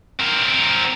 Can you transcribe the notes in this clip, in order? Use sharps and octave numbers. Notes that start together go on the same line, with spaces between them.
C4 A#4